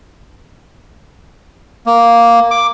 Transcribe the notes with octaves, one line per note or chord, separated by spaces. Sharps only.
A#3
D6